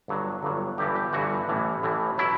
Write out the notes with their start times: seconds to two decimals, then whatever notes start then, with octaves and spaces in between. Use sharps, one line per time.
0.08 G1 G2 F#3
0.43 G1 G2 F#3
0.78 G1 G2 E3 G4
0.96 G4
1.13 G1 G2 E3 F#4
1.48 A1 A2 E3
1.83 A1 A2 E3
2.18 B2 F#3 E4